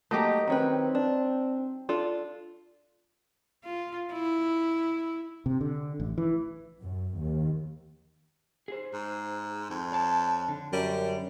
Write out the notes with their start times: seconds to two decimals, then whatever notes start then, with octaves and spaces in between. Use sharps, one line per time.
0.11 F#3 A3 A#3 D#4 G4
0.48 D#3 C4 C#4 B4
0.95 D4
1.89 D4 F4 A4
3.64 F4
4.12 E4
5.46 C3
5.61 D3
6.00 A1
6.18 E3
6.81 F#2
7.18 D#2
8.68 G#4 C5
8.93 G#2
9.70 F2
9.92 C#5 A5
10.48 D3
10.72 F#2 G3